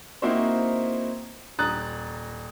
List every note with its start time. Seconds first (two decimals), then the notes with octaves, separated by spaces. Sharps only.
0.22 A#3 C4 D#4 E4 F#4 C5
1.59 D#1 A#5 D#6 F#6 A6